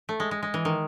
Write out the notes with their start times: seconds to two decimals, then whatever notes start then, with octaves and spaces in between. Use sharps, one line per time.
0.09 A3
0.20 G#3
0.31 G#3
0.43 G#3
0.54 E3
0.65 D#3